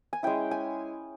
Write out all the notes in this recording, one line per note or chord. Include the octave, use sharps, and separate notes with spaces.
G#5
G#3 C#4 E4 G5
G#5